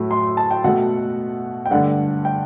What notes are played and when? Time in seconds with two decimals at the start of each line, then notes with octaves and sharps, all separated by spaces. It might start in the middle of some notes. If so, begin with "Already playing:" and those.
Already playing: A2 F#3 A3
0.11 C6
0.37 A5
0.51 G5
0.64 B2 A3 F#5
1.66 G5
1.70 G2 D3 A3 F#5
2.25 G5